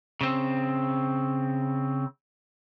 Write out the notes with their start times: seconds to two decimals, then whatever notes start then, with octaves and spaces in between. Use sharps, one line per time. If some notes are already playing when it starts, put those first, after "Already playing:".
0.21 C#3 C4